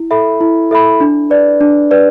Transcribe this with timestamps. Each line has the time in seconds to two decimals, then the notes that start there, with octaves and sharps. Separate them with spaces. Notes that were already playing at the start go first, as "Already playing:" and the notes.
Already playing: E4
0.11 A4 E5 B5
0.41 E4
0.71 A4 E5 B5
1.01 D4
1.30 B4 D5
1.61 D4
1.91 B4 D5